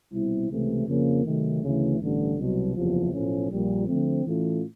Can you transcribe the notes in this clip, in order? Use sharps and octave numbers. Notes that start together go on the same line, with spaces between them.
C2 B2 G3 C4 E4
C#2 C3 E3 A3
F2 C#3 F3 A#3
C3 D#3 F#3 A3
D2 C#3 E3 A3
A1 G2 D3
C2 B2 F#3
F#1 E2 C3 F3
B1 A2 F3 A3 C#4
A#1 A#2 G3
D2 D3 F3 A3 C4
A2 E3 A3 C#4 F4